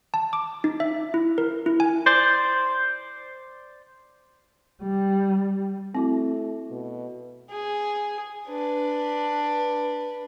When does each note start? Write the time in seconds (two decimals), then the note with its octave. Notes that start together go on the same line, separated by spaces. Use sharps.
0.14 A5
0.33 D6
0.64 D#4
0.80 E5
1.14 E4
1.38 A#4
1.66 E4
1.80 G#5
2.06 C5 D5
4.83 G3
5.95 A3 C4 E4 F#4
6.71 B2
7.50 G#4
8.48 D4 B4